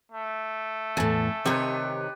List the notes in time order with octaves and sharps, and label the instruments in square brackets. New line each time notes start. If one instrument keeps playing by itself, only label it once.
[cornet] A3
[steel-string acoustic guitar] E2 A2 [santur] G#5 A5
[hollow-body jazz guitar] C3 D#3 [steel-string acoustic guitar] D#4 C#5 [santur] G4 B4